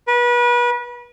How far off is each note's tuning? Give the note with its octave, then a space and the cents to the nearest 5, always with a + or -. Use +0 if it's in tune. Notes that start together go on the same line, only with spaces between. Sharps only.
B4 -30